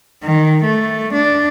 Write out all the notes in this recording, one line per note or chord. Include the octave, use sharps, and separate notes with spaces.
D#3
A3
D4